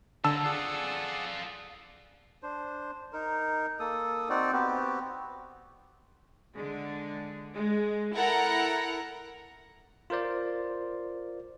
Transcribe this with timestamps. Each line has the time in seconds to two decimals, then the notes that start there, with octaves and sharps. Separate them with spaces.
0.24 D3 D#3 A#3 A5 E6
0.44 F4 G#4 A4 D5 F#5
2.43 D4 C5
3.13 D#4 A#4
3.80 A#3 A4 D#6
4.29 C4 D#4 F#4 D5
4.53 B3 C4 F#4 G4
6.54 D3 G#3
7.55 G#3
8.15 E4 A4 A#4 F#5 A#5
10.10 F4 A#4 C5 D5